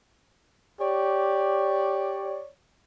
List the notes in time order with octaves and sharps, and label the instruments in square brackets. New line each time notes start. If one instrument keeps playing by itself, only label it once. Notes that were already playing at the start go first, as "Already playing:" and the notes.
[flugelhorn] G4 [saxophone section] C#5 D5